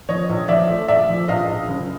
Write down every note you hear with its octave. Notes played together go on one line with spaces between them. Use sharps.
F3 C#5 D#5
A#1
F3 D5 E5
A3
A#1 D5 E5
F3
A#1 D#5 F5
A#1
F#1